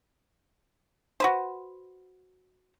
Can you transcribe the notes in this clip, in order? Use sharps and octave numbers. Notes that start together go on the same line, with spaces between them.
F#4 B4 C5